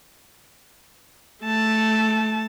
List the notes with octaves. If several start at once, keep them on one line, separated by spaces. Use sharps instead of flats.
A3 A5